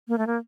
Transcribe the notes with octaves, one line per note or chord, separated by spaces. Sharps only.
A#3
A3
A#3